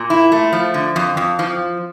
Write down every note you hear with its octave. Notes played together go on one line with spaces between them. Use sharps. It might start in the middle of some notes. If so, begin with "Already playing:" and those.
Already playing: A#2
E4
A3
F3
D3
F2
F2
F3